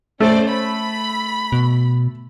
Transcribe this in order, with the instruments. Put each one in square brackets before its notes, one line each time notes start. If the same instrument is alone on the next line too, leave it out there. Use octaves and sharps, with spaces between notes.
[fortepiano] A3 [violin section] C#4 C5 D5
[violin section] B5
[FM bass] B2